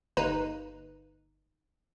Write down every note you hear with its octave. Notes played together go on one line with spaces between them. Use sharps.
G1 A#3 D#4 B4